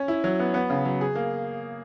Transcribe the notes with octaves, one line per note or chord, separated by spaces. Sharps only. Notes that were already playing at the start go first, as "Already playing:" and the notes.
Already playing: C#4
E4
F#3
B3
B3
C#3
F#3
G#4
A#3